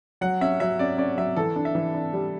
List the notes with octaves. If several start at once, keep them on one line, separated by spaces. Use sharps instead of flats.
F#3 F#5
C#4 E5
F#3 E5
C#4 D5
C#4 D5
F#3 E5
E3 A4
D4
E5
E3
D4
G3